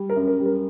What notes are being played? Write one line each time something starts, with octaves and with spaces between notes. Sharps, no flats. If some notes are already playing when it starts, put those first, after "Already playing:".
Already playing: G3
A#4
F#2
A#4
G3
A#4